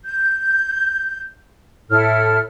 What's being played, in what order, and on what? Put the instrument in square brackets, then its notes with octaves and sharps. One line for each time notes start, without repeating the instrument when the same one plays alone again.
[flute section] G6
[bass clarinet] A2 [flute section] E4 A4 F6